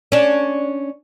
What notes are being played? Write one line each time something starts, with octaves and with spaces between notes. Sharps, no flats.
C#4 D4